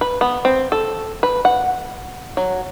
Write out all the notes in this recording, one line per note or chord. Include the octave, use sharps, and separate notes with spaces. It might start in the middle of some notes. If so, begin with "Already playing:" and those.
B4
B3
C4
A4
B4
F#5
F#3